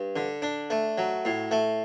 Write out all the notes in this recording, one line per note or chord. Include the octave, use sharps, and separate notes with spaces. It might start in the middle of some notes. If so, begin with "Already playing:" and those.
Already playing: G2
D3
D4
A3
F#3
A2
A3